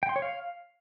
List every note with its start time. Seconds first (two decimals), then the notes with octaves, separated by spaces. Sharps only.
0.03 G5
0.09 C6
0.16 C#5
0.22 F5